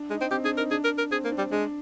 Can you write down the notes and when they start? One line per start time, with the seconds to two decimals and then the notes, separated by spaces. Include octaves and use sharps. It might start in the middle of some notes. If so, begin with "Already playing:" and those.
Already playing: D4
0.10 G#3 D#4
0.21 C4
0.31 C4 G4
0.44 D4 G#4
0.57 D#4 A#4
0.71 D4 G#4
0.84 A#4
0.98 A#4
1.11 C4 G#4
1.24 A#3
1.32 D4
1.38 G3
1.51 G#3 D4